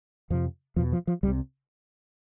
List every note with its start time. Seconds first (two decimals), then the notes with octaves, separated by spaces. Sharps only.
0.30 F2 C3 F3
0.76 E2 F3
0.79 B2
0.92 F3
1.07 F3
1.23 C2 G3
1.27 C3